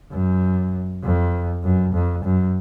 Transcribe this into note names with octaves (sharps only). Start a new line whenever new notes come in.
F#2
F2
F#2
F2
F#2